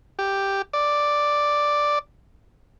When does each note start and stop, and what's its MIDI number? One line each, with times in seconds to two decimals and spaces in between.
0.19 0.62 67
0.73 1.99 74